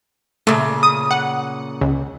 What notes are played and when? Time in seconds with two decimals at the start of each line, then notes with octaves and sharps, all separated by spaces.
0.47 A#2 C#3 A3
0.83 D#6
1.11 F#5
1.81 C#2